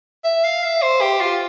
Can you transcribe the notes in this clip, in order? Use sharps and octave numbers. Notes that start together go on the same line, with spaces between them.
E5
F5
E5
C5
G4
F4